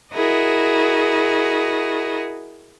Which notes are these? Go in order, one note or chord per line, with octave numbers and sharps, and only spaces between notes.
E4 F#4 G#4 A#4 D#5